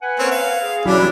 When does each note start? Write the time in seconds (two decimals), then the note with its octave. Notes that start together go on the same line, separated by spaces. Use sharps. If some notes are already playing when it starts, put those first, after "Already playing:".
0.02 B4 F#5 G#5
0.19 A#3 C4 C#4
0.31 F5
0.62 G#4
0.85 B2 E3 F#3 G3 C#4 D4 E4